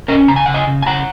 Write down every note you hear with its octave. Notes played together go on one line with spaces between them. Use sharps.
C#4 A#4 D#5
C#3 A#5
G#5
C#3 F#5
D#5 G#5
C#3
G#5
C#3 F#5 A#5